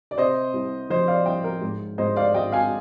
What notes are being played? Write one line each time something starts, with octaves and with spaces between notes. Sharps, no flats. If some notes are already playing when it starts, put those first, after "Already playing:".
D5
C3 C5 D#5
C2
F3 C5 D#5
D5 F5
C2 D#5 G5
A#4
G#2
G#2 C5 D#5
D5 F5
G#1 D#5 G5
F5 G#5